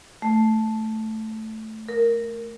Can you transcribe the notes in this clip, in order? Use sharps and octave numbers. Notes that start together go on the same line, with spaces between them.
A3
A#4